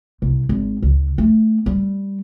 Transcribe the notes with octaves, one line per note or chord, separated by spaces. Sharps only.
C2
G#1
C#2
A3
G3